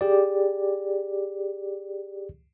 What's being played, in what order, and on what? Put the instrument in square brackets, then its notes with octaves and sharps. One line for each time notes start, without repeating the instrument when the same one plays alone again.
[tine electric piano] G4 G#4 D5